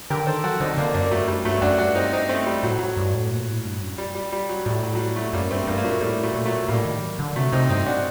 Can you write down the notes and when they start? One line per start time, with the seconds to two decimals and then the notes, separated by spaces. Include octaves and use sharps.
0.10 D3 G4 A#4
0.27 D#3 A4 C5
0.44 F#3 F#4 A4
0.60 D3 C4 D#4
0.77 D3 A#3 D4
0.94 F#2 A#3 D4
1.11 G2 F#3 A3
1.28 F#2 G3
1.45 G2 F#3 A3
1.62 F#2 D4 F#4
1.78 G2 D4 F#4
1.95 C4 D#4
2.13 C4 D#4
2.29 A3 C4
2.46 G3
2.63 A2 F#3
2.79 F#3
2.97 G2
3.14 A2
3.31 A#2
3.48 A2
3.65 G2
3.81 F#2
3.98 G3
4.15 G3
4.32 G3
4.49 F#3
4.66 A2 G3
4.83 F#3
4.95 F#3
4.99 G3
5.16 F#3 A3
5.33 F#2 G3 A#3
5.50 G2 A3 C4
5.67 G2 G3 A#3
5.77 A#3
5.84 A#2 F#3 A3
6.00 A2 G3
6.23 F#3 A3
6.35 A#2
6.46 F#3 A3
6.68 A2 G3 A#3
6.85 D#3
7.02 F#3
7.19 D3
7.36 C3 F#3 A3
7.52 C3 C4 D#4
7.69 G2 C4 D#4
7.87 D4 F#4